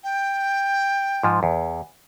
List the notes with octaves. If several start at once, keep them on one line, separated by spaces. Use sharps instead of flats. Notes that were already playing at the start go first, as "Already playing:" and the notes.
G5
G#2 F3
E2